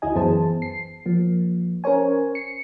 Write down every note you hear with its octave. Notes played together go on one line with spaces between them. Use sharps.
D2 E4 F#4 D#5 G#5
F#2 E3 B3 G#4 C5 A5
C7
F3 A#3
C#4 A#4 C5 C#5 G#5
C7 C#7